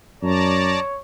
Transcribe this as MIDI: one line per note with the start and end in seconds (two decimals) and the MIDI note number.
0.23 0.76 42
0.23 1.01 73
0.23 0.80 74
0.23 0.80 81
0.23 0.80 82